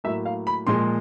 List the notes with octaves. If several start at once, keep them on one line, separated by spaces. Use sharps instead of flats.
A2 F#3 A#3 E5
F5
B5
A#2 F3 G#3 C6